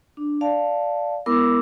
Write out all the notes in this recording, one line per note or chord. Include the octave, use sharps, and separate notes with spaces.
D4
D5 F5 A5
G#3 B3 E4 A#4 D6 E6